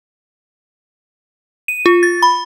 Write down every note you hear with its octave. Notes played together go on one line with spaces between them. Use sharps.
D#7
F4
A6
B5